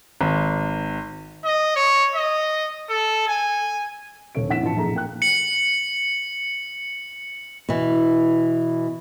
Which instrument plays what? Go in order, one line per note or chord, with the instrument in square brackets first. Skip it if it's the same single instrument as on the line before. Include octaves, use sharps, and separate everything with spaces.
[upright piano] G#1
[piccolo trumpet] D#5
C#5
D#5
A4
G#5
[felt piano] D#1 A4 C#5 D7
F1 E4 F#5 B6 E7
A1 F4 A5 C#7
F1 A#1 A2 G#4 A4 A#5
A#3 G5 F#6
[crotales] C#7 F#7
[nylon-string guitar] B2 E3